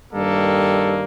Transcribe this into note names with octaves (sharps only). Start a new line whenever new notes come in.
G2 D#3 G3 A#3 A4